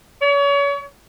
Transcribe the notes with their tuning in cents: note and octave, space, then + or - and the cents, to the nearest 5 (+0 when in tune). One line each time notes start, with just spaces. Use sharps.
C#5 +35